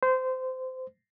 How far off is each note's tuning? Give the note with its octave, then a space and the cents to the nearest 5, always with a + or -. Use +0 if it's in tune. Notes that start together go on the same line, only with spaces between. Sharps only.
C5 -20